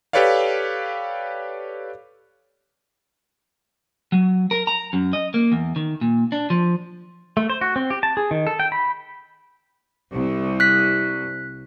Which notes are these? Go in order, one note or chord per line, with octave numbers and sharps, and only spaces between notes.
G4 A4 B4 C#5 D5 F5
F#3
A#4
A#5
F#2
D#5
A#3
E2
D#3
A#2
D4
F3
A3
C5
F#4
C4
G4
A5
G#4
D#3
A4
G5
B5
C2
F#6 B6